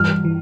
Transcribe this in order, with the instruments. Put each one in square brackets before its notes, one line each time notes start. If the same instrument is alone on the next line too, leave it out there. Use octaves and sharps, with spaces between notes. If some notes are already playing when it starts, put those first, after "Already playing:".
Already playing: [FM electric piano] G2 E3 G3 [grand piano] F6
[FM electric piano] E3